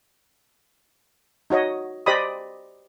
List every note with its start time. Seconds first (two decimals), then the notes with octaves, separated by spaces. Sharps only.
1.50 D#4 F#4 C#5 D#5
2.06 G4 C5 D5 D#5 B5 D#6